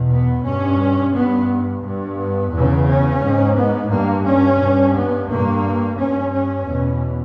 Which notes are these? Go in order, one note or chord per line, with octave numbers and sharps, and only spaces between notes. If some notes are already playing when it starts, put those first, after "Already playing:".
Already playing: E2 B2
B3
G2 C#4
G2 B3
G2
B3
E2
C#3
C#4
G#2
B3
G2 A#3
C#4
G2
B3
G2 A#3
G2 C#4
C#4
E2 B2